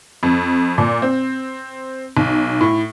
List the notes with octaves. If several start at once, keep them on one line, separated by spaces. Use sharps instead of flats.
F2
A#2
C4
B1
A2